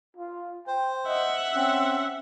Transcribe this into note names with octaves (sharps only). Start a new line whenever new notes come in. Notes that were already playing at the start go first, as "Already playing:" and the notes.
F4
C5 G5
D#5 E5 F#5
C4 C#4